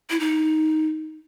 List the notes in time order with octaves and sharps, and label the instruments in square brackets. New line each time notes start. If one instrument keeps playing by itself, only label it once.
[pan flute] E4
D#4